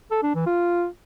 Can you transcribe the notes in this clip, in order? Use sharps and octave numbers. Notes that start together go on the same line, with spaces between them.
A4
D4
E3
F4